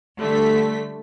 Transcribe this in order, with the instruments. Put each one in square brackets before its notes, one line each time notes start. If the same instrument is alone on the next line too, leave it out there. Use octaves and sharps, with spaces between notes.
[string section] D3 G3 A3 B6